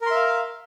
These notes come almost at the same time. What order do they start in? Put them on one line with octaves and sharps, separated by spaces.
A#4 C6 E5 F5